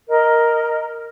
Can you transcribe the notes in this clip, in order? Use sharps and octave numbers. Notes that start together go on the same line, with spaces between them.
A#4 D#5